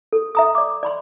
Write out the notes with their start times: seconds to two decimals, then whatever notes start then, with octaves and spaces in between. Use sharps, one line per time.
0.13 A4
0.35 E5 A#5 D#6
0.55 D5 D6
0.83 D5 B5 C6